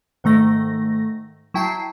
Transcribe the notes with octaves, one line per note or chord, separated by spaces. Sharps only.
G#2 D#3 A3 A#6
F#3 E4 G5 A5 C7